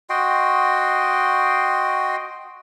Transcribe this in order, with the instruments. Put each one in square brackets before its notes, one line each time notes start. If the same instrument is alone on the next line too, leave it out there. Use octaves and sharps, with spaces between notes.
[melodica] F#4 D#5 G5 C6